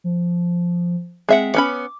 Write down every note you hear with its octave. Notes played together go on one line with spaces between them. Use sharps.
F3
G#3 C4 E5 F#5
B3 C#4 B5 D6